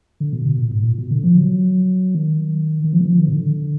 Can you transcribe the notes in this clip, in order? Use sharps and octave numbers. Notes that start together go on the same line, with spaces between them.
D3
B2
B2
A#2
G#2
A#2
B2
D3
F3
F#3
D#3
D#3
F3
D#3
F3
D#3
B2
D3